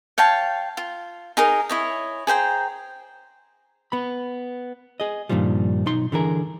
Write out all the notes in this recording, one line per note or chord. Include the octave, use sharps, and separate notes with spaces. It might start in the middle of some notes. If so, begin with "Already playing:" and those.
C#5 F5 G5 A5
F4
D#4 G#4 A#4
E4 C#5 D#5
G#4 C5 G5 A#5
B3 B5
G#4 D#5
G2 A#2 D#3 F3 G3
B1 D#4 C6
D3 E3 G#4 A#4